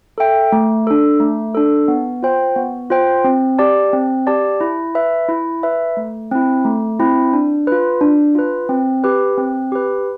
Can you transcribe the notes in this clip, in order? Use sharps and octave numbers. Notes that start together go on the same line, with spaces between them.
A4 E5 G5
A3
D4 A4
A3
D4 A4
B3
F4 C5 G5
B3
F4 C5 G5
C4
G4 D5 A5
C4
G4 D5 A5
E4
B4 E5
E4
B4 E5
A3
C4 E4
A3
C4 E4
D4
F4 B4
D4
F4 B4
C4
G4 B4
C4
G4 B4